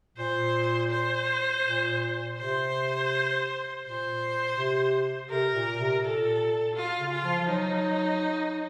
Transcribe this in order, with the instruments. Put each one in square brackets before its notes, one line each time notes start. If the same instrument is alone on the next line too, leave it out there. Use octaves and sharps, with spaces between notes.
[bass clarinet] A#2 [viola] C5
[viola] C5
[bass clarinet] A#2
[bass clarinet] C3 [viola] C5
[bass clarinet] A#2 [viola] C5
[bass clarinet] C3
[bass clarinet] C3 [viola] A#4
[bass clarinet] A#2
C3
[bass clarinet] A#2 [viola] A4
[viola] F4
[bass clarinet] C#3
[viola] F4
[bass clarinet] F3
F3
[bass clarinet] F#3 [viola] D#4